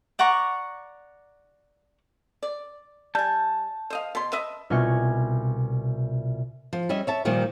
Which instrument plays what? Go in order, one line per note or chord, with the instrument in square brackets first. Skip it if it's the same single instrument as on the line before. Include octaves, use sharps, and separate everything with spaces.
[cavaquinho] D5 F#5 A#5 C#6
[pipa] D5
[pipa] G3 G#5 [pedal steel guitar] A5 G6
[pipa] C5 D#5 F5
B2 C6
B4 D#5 E5
[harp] C2 B2 F4 G#5 C#6
[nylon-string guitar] F3
G3 C#4 D#5 E5
C#5 E5 A5
A#2 D#3 F3 G3